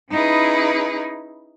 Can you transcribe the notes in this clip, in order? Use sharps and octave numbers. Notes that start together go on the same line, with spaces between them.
C#4 D#4 E4 G#4 B4